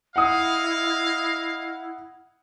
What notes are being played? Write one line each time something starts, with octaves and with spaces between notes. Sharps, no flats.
E4 D#5 F5 F#5 D#6